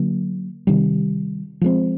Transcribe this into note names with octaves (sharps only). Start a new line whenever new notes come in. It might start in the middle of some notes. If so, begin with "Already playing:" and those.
Already playing: D3 F#3 A#3
C3 D#3 G3
F3 G#3 C4